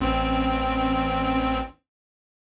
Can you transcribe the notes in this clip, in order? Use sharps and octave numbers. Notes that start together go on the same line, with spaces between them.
A1 C4